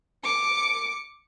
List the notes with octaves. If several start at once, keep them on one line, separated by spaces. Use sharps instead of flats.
D6 C#7